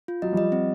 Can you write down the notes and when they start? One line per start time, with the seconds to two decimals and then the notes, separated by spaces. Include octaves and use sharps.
0.08 F4
0.22 F#3 D#5
0.32 F3 G3 D#5
0.52 C4